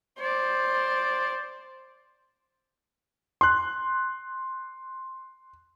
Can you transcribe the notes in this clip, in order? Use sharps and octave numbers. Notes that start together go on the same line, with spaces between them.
C5 D5
C6 F#6